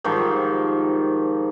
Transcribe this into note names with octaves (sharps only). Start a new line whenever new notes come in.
G#2 D#3 F3 G3